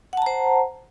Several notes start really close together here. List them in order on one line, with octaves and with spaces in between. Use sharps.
F#5 A5 A#5 C5